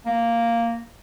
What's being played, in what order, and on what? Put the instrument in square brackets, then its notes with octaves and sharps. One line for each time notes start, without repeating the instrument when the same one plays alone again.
[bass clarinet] A#3